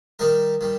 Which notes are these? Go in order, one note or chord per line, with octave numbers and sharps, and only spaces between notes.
D#3 G3 D#4 A#4
D#3 G3